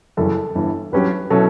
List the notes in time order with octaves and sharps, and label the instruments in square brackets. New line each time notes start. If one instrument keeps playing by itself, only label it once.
[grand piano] F#1 F#2 E3 G3 [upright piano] A4
[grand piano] G1 G2 E3
[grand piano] A1 G2 F#3 C#4 G4 [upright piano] B4
[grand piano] B2 F#3 C#4 E4 [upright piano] A4